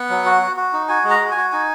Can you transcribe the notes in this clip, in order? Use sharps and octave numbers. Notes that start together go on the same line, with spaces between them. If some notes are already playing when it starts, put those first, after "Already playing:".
Already playing: B3 F#5
F#3
F#4
F#4
F#4
D#4
F#4 G#5
G#3
A#5
F#4
G#5
F#4
D#4 G#5